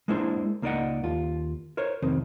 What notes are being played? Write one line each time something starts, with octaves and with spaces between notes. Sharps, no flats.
G#3 A#3 D4 E4 C5
C#2 A#3 D#4 D5 D#5 F#5
D#2 F4
A#4 C5 C#5
C2 F2 D#3 C4